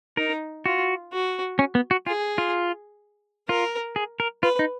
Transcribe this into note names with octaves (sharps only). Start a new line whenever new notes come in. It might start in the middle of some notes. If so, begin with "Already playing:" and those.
D#4 A#4
F4 F#4
F#4
C#4
B3
F#4
F4 G#4
F4
F4 A#4
G#4
A#4
F4 B4
D#4